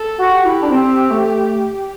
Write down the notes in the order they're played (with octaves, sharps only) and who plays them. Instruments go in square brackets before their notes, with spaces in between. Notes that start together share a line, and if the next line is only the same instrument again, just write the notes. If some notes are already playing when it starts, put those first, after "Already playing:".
Already playing: [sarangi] A4
[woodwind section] F#4
[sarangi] G4
[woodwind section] E4
D4
C4
A3